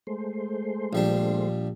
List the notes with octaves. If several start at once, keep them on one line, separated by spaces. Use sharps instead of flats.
G#3 A3 C5
A#1 G3 D4